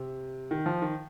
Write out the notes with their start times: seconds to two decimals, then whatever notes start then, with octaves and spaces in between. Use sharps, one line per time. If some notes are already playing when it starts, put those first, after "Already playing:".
Already playing: C3
0.51 D#3
0.66 F3
0.82 D#3